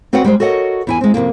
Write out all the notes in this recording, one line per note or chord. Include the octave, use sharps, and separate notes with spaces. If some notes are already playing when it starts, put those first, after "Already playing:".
C4 F#4 B4 C#5 F#5 G5
G3 G#3 C5
F#4 A4 A#4 C#5 D#5 F#5
E2 E4 G#5
G#3 C4
F2 G#2 C3 A#3